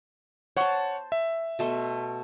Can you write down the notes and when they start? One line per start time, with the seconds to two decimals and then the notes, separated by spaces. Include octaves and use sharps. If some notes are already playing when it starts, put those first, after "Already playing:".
0.57 C5 C#5 F#5 A5 C#6
1.12 E5
1.59 B2 A3 C6